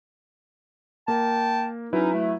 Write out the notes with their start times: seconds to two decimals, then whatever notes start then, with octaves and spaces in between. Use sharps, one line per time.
1.08 A#3 A#4 G5 A5
1.93 F#3 C#4 D#4 E4 B4
2.13 A3